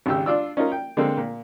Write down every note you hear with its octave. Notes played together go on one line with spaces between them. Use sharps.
G#1 C#3 G4 E6
D4 F4 D5 E6
C#4 D#4 F4 A#4
G5
D3 G#3 A#3 C4 A4
A#2